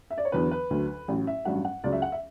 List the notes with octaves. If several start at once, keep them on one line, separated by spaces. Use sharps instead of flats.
E5
D5
C#5
E2 D3 F#3 B4
B4
D2 D3 F#3
A1 A2 F#3
E5
A1 G2 F#3 F#5
F#5
C#2 C#3 F#3 D5
E5
F#5
E5